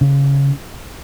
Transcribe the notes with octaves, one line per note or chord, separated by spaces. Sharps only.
C#3